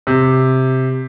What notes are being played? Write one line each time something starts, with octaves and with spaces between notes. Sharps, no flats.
C3